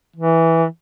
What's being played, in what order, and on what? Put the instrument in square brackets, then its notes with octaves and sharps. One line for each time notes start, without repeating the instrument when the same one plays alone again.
[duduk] E3